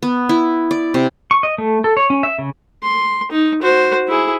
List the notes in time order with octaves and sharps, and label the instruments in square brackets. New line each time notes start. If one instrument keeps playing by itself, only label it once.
[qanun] B3
E4
D5
C3
[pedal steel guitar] C#6
D#5
A3
A4
C#5
C#4
E5
C#3
[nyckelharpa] C6
D#4
F#4 C5
E4 G#4